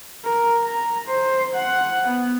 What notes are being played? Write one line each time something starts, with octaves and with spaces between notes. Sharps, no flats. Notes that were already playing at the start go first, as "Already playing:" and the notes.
A#4
A#5
C5
F#5
B3